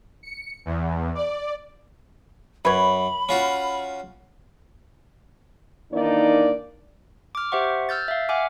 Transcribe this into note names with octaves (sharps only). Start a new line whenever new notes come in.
C#7
E2
D5
F#2 B4 C#5 B5
C#4 F4 F#4
D#3 E3 A#3 D4 D#4 D5
D6 F6
G4 C5 E5 F#5 C#6
E6 F6 G6 A6
E5 F5
E5 F#5 G#5 D6 F6